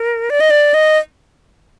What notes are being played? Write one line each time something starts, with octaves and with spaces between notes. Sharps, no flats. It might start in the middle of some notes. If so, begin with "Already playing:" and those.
Already playing: A#4
D5
D#5
D5
D#5